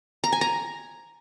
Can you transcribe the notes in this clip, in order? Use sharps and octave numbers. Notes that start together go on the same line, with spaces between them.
A#5
G#5
A#5